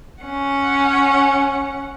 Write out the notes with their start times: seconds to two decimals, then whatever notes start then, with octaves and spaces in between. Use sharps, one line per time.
0.23 C#4 F#5